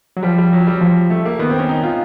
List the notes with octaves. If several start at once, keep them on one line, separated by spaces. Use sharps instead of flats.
F#3
F3 G3
G3
F#3
G3
F3
A3
A#3
D#3 B3
C4
C#4
D#4
F4